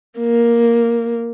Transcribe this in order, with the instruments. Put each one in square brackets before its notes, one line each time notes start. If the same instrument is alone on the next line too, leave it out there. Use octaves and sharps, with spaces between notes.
[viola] A#3